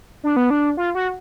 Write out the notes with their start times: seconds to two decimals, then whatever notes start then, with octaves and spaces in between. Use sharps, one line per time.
0.23 D4
0.36 B3
0.50 D4
0.77 F4
0.95 F#4